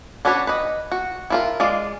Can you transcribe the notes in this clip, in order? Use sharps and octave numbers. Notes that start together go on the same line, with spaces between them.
C#4 D4 F#4 B4 C#5
B4 D#5
F#4
E4 F4 A#4
G#3 F4 D5 F5